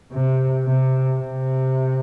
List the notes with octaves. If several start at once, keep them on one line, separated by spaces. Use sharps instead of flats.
C3
C3
C3